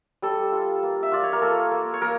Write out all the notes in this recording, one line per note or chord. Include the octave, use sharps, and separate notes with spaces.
G3 A4
F4
A#3
E5
F4 D5
C#5
A#4
A#3 A4
A#3
C#5
A#3 A#4